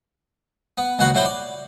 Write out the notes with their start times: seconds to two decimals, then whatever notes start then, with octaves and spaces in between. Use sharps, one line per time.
0.78 B3
0.99 C#2 D#3 A#3 F#4 B4 B5
1.14 A2 F#3 E4 C5 G5 B5
1.25 D5